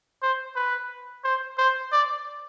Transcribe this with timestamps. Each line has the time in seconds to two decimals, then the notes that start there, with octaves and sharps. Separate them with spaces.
0.22 C5
0.56 B4
1.24 C5
1.58 C5
1.92 D5